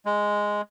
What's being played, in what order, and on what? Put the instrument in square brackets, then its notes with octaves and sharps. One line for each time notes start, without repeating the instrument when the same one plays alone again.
[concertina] G#3